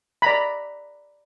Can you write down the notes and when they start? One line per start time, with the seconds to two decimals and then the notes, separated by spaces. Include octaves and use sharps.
0.22 D5 A#5 B5